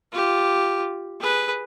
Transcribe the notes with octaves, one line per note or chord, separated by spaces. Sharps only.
F4 G4
G#4 B4